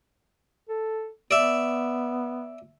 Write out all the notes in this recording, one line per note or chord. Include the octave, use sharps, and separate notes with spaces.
A4
B3 D5 E5